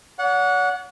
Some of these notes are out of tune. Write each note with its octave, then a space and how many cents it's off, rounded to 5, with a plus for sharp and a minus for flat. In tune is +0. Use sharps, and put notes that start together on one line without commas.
C#5 +45 F#5 -15